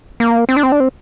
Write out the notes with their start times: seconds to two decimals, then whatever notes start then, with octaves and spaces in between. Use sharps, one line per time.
0.20 A#3
0.49 C4
0.57 D4
0.63 C4
0.72 D4
0.80 C4